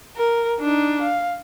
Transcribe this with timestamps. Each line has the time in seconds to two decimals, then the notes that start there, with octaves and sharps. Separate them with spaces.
0.16 A#4
0.60 D4 D#4
1.02 F5